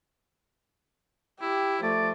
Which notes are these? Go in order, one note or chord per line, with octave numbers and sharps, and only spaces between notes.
E4 G4
F3 A3 D5